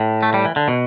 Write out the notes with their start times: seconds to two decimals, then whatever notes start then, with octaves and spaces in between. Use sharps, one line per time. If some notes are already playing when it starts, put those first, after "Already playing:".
Already playing: A2
0.23 A3
0.34 G3
0.45 E3
0.56 D3
0.68 B2